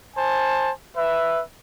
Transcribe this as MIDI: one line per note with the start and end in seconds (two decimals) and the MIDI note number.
0.16 0.70 72
0.16 0.70 80
0.16 0.70 81
0.96 1.40 71
0.96 1.40 76